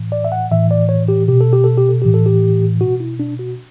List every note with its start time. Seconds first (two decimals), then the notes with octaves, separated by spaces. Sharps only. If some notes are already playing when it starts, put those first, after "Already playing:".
Already playing: A2 E3
0.12 D5
0.25 E5
0.32 F#5
0.51 A2 E3 E5
0.71 D5
0.89 C#5
1.08 G4
1.28 B2 G4
1.41 A4
1.53 G4
1.64 A4
1.78 G4
1.89 A4
2.02 A2 E3 G4
2.14 A4
2.26 G4
2.81 B2 F#4
3.00 E4
3.20 D4
3.39 F#4